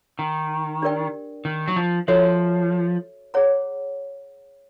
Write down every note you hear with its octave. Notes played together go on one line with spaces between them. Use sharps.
D#3
D4 G4 A#4 D5 G5
D#3
F#3
F3
F3 F#4 A4 C#5 E5
G#4 C#5 F#5 A#5